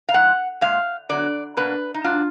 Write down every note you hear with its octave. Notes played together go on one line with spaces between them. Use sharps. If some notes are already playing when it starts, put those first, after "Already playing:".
F5
G#2 F3 F#5
A#2 G#3 F5
D3 F#3 B3 D5
B2 A#3 D4 B4
D#4
G#2 F#3 D4 F4